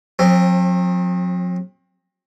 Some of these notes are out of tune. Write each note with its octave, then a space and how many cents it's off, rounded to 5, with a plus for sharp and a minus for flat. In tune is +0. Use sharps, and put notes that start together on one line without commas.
F#3 -45 C4 +25